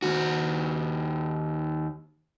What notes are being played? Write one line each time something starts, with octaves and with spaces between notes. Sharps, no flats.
D#2 F#4